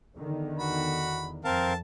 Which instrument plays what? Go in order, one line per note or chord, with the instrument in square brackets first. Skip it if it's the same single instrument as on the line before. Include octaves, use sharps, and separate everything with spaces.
[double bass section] E2 D3 D#3
[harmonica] F#4 B5
[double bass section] F2 [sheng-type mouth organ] C4 A#4 F5 [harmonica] A5